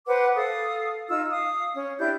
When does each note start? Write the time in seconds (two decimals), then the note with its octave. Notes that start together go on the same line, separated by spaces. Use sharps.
0.07 B4 C5 F#5 D6
0.35 A4 F5 D#6
1.09 D#4 F4 E6
1.30 F5 D#6
1.74 C#4
1.98 D4 E4 G4 G6